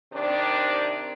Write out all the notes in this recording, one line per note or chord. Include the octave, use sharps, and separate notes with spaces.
C3 D#3 D4